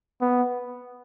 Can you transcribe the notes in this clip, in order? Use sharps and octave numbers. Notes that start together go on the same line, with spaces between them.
B3